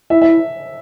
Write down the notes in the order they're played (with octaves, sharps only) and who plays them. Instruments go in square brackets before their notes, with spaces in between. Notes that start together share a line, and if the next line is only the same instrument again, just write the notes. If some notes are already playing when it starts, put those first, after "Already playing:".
[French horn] E4 [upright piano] E5
[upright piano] E5